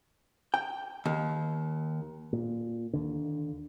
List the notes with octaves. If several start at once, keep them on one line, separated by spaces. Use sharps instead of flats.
G5
D#2
A#2
D#2 D3